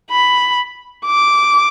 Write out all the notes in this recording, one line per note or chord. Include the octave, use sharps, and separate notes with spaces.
B5
D6